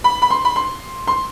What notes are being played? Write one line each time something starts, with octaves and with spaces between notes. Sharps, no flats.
B5
B5
C6
B5
C6
C6